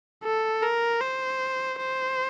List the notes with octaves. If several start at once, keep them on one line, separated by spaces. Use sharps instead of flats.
A4
A#4
C5
C5